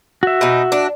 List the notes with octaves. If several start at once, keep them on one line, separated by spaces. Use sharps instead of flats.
F#4 E5
B2 D#4
D4